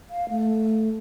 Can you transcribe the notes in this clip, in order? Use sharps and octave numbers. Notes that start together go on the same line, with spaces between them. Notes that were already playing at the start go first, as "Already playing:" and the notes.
F5
A3